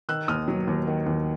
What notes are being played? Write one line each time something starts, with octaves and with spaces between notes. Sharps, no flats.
D#3 E6 F#6
D#2 D#6 F6
F#3
D#2
D#3
D#2